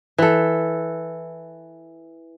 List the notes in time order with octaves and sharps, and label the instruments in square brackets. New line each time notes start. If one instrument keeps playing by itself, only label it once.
[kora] E3 A4